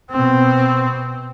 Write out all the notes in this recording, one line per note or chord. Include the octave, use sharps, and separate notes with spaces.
B2 C4